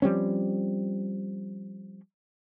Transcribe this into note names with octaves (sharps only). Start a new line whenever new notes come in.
F3 G3 C4 C#4